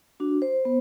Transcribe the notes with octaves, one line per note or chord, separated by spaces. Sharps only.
D4 F#4
C5
B3